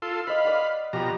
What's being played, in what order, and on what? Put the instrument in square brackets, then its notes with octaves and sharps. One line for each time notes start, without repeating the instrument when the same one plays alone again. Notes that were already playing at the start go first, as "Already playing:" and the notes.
[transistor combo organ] F4 A4 C6
[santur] C5 D#5 [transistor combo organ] F5 B5
[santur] B4 D5 F#5
[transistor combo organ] B2 F3 A#5 [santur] G4 B5